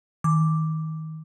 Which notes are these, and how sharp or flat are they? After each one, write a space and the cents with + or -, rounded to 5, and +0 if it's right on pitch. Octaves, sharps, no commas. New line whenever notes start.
D#3 +25 D6 +0